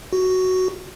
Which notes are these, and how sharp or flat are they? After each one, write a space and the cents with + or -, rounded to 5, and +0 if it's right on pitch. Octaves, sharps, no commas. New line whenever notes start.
F#4 +5